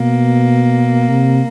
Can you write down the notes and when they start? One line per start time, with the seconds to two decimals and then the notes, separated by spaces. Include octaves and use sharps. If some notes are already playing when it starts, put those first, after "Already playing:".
Already playing: B2 A#3
1.09 C3